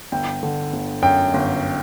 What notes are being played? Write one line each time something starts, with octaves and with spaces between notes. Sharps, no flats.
G1 G5
D3
G1
F#2 G5
G1